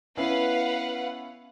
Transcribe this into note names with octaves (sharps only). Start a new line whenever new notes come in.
B3 C#4 E4 B4 F5 F#5